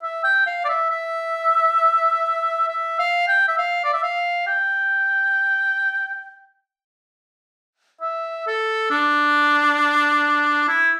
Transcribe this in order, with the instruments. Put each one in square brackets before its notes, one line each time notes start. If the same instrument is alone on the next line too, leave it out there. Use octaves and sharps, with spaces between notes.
[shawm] E5
G5
F5
D5
E5
E5
E5
F5
G5
E5
F5
D5
E5
F5
G5
E5
A4
D4
E4